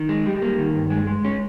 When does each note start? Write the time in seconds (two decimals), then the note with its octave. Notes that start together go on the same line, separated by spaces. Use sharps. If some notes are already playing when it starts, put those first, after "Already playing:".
Already playing: D#3
0.09 G#3
0.26 G3
0.42 A#3
0.58 D#3
0.75 G2
0.91 G#3
1.07 G#3
1.25 C#4